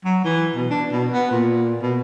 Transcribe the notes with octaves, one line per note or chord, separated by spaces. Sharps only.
F#3
E3
B2
D4
B2
B3
A#2
B2